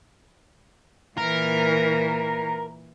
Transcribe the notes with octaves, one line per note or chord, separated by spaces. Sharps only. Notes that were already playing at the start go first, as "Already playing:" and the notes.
A#2 E3 A#4